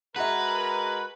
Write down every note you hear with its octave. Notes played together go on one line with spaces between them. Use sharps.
G#3 F#4 A#4 B4 E5 F#5 A#5